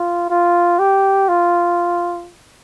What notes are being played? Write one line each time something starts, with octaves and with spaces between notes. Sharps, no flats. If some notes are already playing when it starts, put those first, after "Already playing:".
Already playing: F4
F4
G4
F4